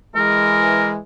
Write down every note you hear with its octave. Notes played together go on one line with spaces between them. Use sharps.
E3 G#3 A#4